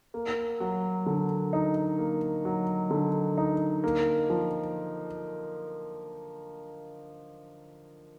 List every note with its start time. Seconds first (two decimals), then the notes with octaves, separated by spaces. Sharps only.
0.14 A#3
0.60 F#3
1.06 D3
1.53 D#4
1.99 A#3
2.45 F#3
2.91 D3
3.38 D#4
3.84 A#3
4.30 F3